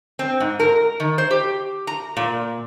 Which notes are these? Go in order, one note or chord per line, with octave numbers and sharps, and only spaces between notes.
C4
G#2
A#4
D#3
C5
G4
A#5
A#2